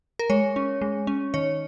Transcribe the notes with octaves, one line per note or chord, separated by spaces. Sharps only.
A#4
G#3 C#5
C#4
G#3
C#4
D#3 C#5